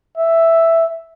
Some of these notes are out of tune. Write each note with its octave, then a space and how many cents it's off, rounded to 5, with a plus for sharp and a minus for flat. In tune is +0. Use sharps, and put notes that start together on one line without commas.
E5 +0